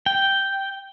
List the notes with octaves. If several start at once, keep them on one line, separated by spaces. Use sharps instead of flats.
G5